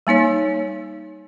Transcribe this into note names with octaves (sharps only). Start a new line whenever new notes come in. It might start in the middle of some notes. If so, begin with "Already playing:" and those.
G3 A#3 D#4 C#5